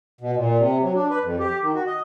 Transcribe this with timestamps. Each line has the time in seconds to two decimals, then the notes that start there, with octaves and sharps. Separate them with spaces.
0.21 B2
0.36 A#2
0.58 C3
0.82 F#3
0.95 D4
1.10 B4
1.23 F2
1.39 G4
1.62 D#3
1.75 F#4
1.87 D#5